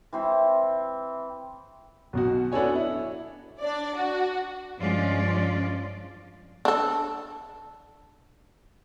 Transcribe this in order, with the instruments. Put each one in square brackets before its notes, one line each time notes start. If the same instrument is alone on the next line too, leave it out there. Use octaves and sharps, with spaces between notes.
[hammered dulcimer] E3 C4 E5
[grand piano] B1 B2 F#4
B3 D4 F#4 A4 C#5 G#5
E4
[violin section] D4 D5
F#4
[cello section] G2 F3 G#3 C#4 F4 D5
[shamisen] D4 A4